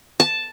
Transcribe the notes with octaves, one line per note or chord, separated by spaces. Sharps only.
A5